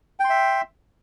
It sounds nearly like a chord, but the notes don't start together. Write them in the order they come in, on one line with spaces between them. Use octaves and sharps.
G5 C6 E5